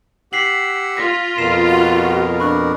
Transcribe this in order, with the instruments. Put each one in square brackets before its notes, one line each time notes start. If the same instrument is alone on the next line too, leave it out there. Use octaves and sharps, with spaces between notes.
[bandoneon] G4 F#5 E6 [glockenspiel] B6 C7 F#7
[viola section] F4 [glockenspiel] A#6 B6
[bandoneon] F2 B2 A#4 [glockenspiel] C7 E7
[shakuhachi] F#4
[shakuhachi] D4 [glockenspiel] B5 C#6 F#6